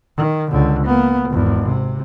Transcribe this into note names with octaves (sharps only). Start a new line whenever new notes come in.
D#3
C#2 D3
A#3 B3
G#1 E2
C3